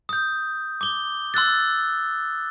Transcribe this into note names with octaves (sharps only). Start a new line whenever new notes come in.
D#6 G6
D6 G7
C6 E6 F#6 A6